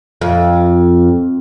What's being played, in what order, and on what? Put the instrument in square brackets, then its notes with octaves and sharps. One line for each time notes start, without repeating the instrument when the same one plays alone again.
[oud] F2